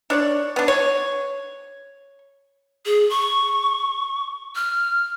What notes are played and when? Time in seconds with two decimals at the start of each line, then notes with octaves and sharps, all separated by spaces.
0.10 D4 C#5 D5
0.56 B3 D4
0.68 C#5
2.86 G#4
3.10 C#6
4.55 F6